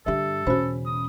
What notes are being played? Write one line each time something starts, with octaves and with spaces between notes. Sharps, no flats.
G2 D3 G4 A4 E5
E1 C#3 C#4 F#4 C5 B5
D#6